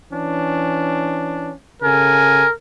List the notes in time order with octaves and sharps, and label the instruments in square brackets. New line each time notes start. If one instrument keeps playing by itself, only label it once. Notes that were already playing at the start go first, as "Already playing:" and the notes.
[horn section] E3 C#4 D4
[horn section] C#3 A4 G#5 [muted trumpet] A#4